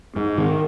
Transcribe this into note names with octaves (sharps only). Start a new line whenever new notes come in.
G#2
D#3